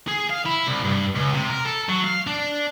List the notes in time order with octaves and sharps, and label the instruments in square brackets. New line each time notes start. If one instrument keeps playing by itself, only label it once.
[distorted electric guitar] G#4
F5
E4
C2
G2
C#2
C3
A#4
A4
F#3
F5
D4